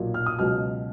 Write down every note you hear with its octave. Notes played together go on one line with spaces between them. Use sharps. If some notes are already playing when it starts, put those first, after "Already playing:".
Already playing: B1 A#2 F#3
F6
D#6
C#2 B2 F#3 F6